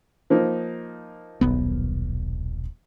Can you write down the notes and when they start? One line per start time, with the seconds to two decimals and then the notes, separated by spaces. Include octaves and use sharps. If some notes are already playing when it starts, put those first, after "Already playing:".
0.30 F3 A#3 D#4
1.41 D#1 B1 B3